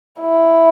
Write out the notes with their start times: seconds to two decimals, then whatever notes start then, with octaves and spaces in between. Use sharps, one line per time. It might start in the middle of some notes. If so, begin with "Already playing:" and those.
0.20 E4